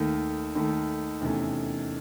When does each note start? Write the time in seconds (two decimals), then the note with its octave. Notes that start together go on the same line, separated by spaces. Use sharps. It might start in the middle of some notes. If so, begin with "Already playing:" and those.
Already playing: D#2 D#3 A3
0.55 D#2 D#3 A3
1.21 E2 C3 D#3 A3 C#4